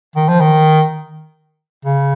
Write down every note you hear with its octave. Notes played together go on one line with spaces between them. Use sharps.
D#3
F3
D#3
C#3